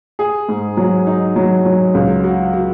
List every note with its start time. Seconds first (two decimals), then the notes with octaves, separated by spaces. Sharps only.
0.19 G#4
0.49 G#2
0.77 F#3
1.07 D#4
1.36 F#3
1.65 F#3
1.94 C#2
2.24 F#4
2.53 F#4